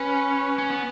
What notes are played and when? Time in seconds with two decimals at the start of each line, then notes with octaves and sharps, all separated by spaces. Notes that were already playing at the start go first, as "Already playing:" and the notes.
Already playing: C#4 B4
0.58 C#4
0.70 B3